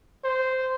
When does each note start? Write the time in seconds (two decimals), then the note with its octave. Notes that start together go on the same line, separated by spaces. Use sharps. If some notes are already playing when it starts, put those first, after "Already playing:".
0.24 C5